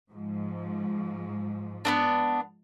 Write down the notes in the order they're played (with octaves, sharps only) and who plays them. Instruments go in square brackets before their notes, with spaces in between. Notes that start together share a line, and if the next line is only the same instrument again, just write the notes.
[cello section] G#2 F3
[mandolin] B3 C4 D4